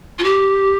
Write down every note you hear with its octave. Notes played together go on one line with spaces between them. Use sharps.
F4
G4